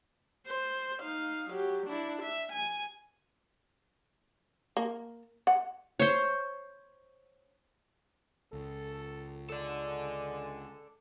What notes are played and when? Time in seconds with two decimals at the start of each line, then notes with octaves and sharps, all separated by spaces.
0.47 C5
1.01 D#4 F5
1.50 F#3 G4
1.87 D4 E4
2.22 E5
2.53 G#5
4.77 A#3
5.47 F#5
6.00 C5 C#5
8.53 C#2 A4
9.50 G#3 A4 D5